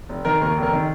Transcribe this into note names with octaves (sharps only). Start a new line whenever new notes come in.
F1
D#3 A#4
D#2 A#4
F1
A#4
D#3